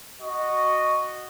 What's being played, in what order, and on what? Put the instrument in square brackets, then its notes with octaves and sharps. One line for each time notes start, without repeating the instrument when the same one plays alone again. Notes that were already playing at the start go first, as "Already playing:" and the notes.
[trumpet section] F#4 D#5